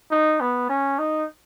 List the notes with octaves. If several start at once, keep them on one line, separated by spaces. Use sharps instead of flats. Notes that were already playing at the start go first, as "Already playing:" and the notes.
D#4
B3
C#4
D#4